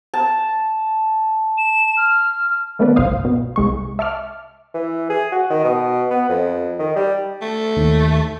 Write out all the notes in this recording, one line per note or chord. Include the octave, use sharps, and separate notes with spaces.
A5
E7
F6
D#3 A3 B3 C4 B4 D5
G1 C2 C5 F5 D#6
B2
C2 G#3 C#6
E5 A5 C#6 D6 F6
E3
G#4
F#4
D#3
B2
B3
F2
D#3
G3
A3
D#2